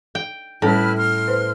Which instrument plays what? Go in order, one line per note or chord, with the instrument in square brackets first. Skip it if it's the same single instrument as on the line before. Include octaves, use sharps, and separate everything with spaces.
[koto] G5
[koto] A2 [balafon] G3 C#4 A5 [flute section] E4 B4 F6
[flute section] C6 F6
[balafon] B4 C5